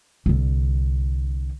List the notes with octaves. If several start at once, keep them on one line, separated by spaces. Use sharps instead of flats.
C2 D3